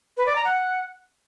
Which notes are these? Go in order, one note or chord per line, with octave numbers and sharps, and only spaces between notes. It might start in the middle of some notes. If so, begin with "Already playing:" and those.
B4
D5
A#5
F#5